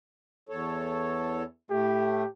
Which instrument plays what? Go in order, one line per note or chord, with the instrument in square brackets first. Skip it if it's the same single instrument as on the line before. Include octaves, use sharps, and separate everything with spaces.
[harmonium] E2 A4 C#5
[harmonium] A2 A3 [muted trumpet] G4